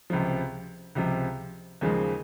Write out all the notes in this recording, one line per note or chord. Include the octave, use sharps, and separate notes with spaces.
C#2 C3 F3
C#2 C3 F3
D#2 C#3 F3 G#3